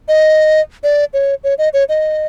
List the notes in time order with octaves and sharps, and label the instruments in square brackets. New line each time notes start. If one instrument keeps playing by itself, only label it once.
[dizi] D#5
D5
C#5
C#5
D#5
C#5
D#5